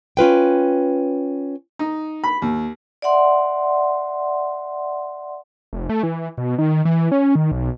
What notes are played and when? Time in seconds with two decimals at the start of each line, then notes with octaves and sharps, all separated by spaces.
0.17 C#4 F4 B4 G5
1.79 D#4
2.24 B5
2.42 D#2
3.02 D5 E5 F#5 C6
5.73 F1
5.89 A3
6.03 E3
6.38 B2
6.58 D#3
6.85 E3
7.12 C#4
7.35 D#3
7.52 B1